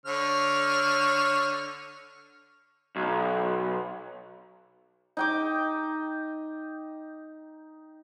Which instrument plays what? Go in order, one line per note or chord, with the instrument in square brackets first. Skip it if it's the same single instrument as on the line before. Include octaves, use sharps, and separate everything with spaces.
[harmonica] D3 C#5 F6
[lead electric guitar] B1
[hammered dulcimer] D#4 G5 D6